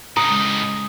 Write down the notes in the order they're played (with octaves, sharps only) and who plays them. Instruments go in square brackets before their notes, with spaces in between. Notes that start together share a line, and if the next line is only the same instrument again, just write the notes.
[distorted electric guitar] A2 D#4 [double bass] C#3 G#3 [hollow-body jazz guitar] A#5 [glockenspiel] D#6